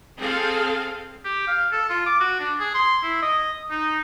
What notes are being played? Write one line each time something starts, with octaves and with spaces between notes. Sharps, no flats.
C4 G#4 A4 F5
G4
F5
A4
F4
D6
F#4
D4
G#4
C6
E4
D#5
D#4